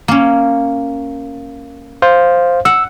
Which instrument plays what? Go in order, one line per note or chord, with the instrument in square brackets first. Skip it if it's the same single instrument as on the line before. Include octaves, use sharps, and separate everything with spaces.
[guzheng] A#3 C#4
[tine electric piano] C5 F5
[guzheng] F#5 [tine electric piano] E6